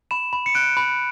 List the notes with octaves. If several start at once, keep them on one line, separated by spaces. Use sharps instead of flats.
B5 E7
B5
C#7
F#6 D7
B5